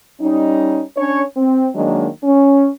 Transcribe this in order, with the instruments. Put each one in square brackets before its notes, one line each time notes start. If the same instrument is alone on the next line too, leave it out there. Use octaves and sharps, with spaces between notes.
[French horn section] G3 C#4 D#4
C#4 D4 C#5
C4
D#3 F#3 G#3 A#3 D4
C#4